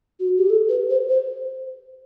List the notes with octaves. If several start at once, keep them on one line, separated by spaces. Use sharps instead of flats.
F#4
G4
A4
B4
C5
C5